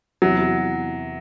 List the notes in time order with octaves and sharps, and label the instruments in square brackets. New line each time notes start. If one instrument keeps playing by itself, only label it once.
[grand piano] E2 C3 E3 [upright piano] F#3